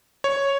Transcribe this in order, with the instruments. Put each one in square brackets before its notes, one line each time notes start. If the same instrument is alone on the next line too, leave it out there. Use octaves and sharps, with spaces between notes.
[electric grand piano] C#5